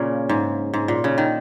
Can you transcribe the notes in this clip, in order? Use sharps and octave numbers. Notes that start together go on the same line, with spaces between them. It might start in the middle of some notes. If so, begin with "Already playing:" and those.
Already playing: A#2 C#3 A#3 C#4
G#2
G#2
A#2
C#3
D#3